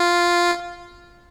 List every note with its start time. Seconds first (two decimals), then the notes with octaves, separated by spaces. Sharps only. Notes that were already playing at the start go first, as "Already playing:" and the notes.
Already playing: F4